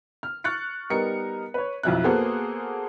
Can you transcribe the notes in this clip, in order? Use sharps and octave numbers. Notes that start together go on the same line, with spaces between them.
F6
C#6 F6 F#6 A6 C#7
G3 B3 D#4 A#4 C#7
B4 C#5
B1 F2 E4 F#6
A#3 B3 F#4 G#4 A4 C5